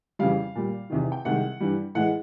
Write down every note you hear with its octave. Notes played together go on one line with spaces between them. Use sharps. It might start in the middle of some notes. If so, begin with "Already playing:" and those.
F2 C#3 E3 G3 F5
A#2 G3
E2 C3 D#3
G5
C2 C3 D#3 G#3 F#5
G2 E3 G3
A2 E3 G#3 F#5